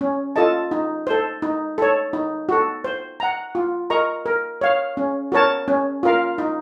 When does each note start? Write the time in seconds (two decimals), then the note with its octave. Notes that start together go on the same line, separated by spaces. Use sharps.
0.01 C#4
0.36 F4 A4 D#5 A5
0.71 D#4
1.07 A4 C5
1.42 D#4
1.78 A4 C#5
2.13 D#4
2.49 F#4 A4
2.84 C5
3.20 F#5 A#5
3.55 F4
3.90 A#4 D#5 A#5 C#6
4.26 A#4
4.61 C#5 F5
4.97 C#4
5.32 F#4 A#4 C#5 A5
5.68 C#4
6.03 F4 A#4 F5
6.38 D#4